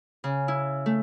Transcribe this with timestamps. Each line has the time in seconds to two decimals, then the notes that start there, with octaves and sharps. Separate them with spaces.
0.24 C#3
0.48 E4
0.86 A3